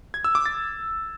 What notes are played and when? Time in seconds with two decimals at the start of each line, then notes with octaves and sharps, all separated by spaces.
0.14 G#6
0.24 E6
0.35 D6
0.46 A6